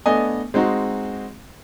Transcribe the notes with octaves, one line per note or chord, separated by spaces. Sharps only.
A3 B3 D4 D#5 G#5
G#3 C4 D#4 F#4